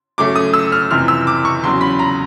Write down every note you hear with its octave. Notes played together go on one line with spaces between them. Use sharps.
F#2 C#3 F#3 A3 C#4 D6
D#6
E6
F6
F#1 F2 C3 E3 F6
E6
D6
C#6
E2 C#3 F#3 C6
B5
A#5